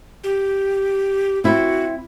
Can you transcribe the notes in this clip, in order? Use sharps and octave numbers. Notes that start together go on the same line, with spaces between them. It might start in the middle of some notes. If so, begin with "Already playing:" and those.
G4
C4 E4 F#4